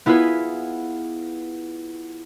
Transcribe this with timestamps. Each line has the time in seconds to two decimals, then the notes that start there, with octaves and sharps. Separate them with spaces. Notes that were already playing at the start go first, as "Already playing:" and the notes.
0.06 B3 E4 F4 G#4 B4